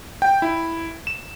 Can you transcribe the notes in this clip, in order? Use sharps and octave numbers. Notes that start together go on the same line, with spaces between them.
G5
E4
E7